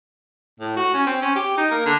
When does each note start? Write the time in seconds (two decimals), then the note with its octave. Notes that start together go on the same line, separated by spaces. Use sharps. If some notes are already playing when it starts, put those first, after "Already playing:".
0.60 A2
0.76 F#4
0.94 C#4
1.07 C4
1.22 C#4
1.36 G4
1.58 D#4
1.71 A#3
1.86 D3